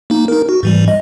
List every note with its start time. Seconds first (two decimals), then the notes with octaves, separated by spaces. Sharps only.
0.10 A#3 D#4
0.28 D#4 A#4
0.49 F#4
0.63 G#2 E3 G3
0.88 D#5